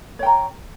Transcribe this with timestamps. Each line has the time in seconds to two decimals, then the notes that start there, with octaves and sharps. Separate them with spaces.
0.19 C#5
0.23 G5
0.26 A#5